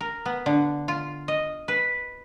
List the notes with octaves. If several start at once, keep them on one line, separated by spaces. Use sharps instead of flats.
A#4
B3
D3
F4
D#5
B4